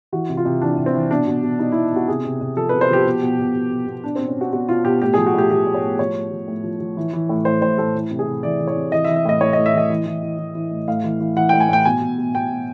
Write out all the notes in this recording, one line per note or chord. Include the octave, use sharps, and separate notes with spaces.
E3 F#4
C3
F4
C3
E3 D4
C3
C4
E3
B2 D4
B2
B2
B2 D#4
B2 E4
B2 F#4
C3 G#4
C3
C3
F3 A4
C3 B4
C5
F3 G4
B2
B2
B2
B2
B2
B2
B2 D4
B2 C4
C#4
B2
F#4
B2 F#4
B2 F4
B2 G4
A2 G4
F3 G#4
F#4
A2 G4
F3 G4
A2
C#5
A2
F3 C#5
A2
F3
A2
F3
F3
E3
E3
A2
A2 C5
A2 C5
A2 A4
E3
C3
G#4
C3
E3 D5
E3
C#5
C3
E3 D#5
E5
E3
E5
A2 D#5
A2 C#5
A2 D#5
E5
E3 D#5
E3
E3
E3
E3
E3
A2
A2 F5
E3
E3
E3 F#5
A2 G5
G#5
A2 G5
B2 G#5
B2
B2
B2 G5
B2